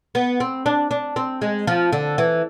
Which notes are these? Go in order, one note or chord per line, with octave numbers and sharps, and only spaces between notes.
B3
C4
D4
D4
C4
G#3
F3
D3
E3